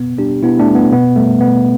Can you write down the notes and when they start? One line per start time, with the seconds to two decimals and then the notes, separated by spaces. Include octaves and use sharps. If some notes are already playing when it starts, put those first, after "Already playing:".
Already playing: B2 B3
0.18 G3 D4 G4
0.42 B2 B3 E4
0.59 A3 D4
0.68 G3
0.75 B3
0.92 B2 B3
1.16 G3 A3
1.41 B2 B3